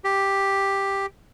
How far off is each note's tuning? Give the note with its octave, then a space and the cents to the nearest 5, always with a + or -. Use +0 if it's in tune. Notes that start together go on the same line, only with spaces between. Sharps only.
G4 +5